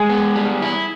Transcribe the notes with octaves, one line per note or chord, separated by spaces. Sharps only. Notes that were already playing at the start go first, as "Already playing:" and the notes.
Already playing: G#3 G#4
B3
G3
E4